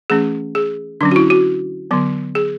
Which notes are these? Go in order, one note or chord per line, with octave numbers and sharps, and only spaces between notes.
E3 A3 C#4 G#4
G#4
D3 F#3 C#4 D4
F#4
E4
F#4
D3 F#3 B3
G#4